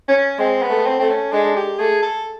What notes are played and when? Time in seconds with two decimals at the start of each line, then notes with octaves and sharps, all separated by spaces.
0.08 C#4
0.39 G#3 C4
0.62 B3
0.70 A3
0.86 C4
0.99 A3 C4
1.09 C#4
1.32 G#3 D4
1.56 G4
1.79 A3 G#4
2.02 A4